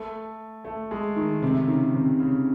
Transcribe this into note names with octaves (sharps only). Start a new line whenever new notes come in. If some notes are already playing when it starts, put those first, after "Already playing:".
Already playing: A3
A3
G#3
D#3
C3
C#3
D#3
C3
C#3